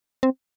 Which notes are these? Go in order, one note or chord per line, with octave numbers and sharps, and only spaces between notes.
C4